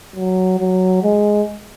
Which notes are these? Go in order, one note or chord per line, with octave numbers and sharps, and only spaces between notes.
F#3
F#3
G#3